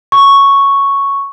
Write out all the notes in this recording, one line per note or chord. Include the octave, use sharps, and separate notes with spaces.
C#6